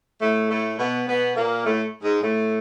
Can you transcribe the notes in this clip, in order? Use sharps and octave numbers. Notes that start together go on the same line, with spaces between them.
A2 A3
A2 A3
B2 B3
B2 B3
A#2 A#3
A2 A3
G#2 G#3
A2 A3